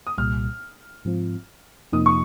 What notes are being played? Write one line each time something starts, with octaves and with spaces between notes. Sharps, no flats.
D#6
C2 A#2 G3 F6
G#2 F3 C4 F4
F2 C3 F3 A#3 D#4 D#6
C#6